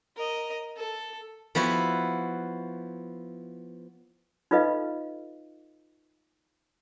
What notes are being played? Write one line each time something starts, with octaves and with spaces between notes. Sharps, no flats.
A#4 D#5
A4
F3 B3 E4 F#4
D#4 F4 A4 B4 D#5 F5